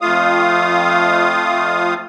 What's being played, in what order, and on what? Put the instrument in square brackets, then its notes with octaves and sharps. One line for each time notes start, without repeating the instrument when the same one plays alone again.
[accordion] F2 A3 F4 F5 D#6